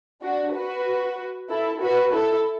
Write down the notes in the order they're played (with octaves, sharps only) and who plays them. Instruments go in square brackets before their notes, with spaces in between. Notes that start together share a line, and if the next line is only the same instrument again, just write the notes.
[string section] D4 F#4
F#4 B4
E4 A4
F#4 B4
E4 A4